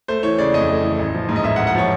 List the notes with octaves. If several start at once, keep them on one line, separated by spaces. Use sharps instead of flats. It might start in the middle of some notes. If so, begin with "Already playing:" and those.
A3 C5
E3 C#5
C#3 D5
F2 D#5
A3
E3
A1
F3
G#2
D#5
A1 E5
F#5
A1
F#5
F3 C#5